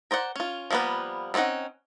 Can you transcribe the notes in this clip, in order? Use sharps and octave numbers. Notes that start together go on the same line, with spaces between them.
A#4 C5 D5 F#5
C#4 F4
F3 G3 A#3 B3 B4
G3 C4 C#4 D#4 F#5